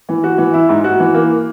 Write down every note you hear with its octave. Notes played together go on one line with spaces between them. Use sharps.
E3
F#4
E3
E4
G#2
F#4
E3
A#3